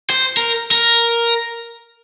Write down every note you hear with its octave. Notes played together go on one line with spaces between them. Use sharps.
C5
A#4
A#4